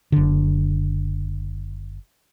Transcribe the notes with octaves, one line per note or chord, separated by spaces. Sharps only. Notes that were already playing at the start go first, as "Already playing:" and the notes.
F#1 D3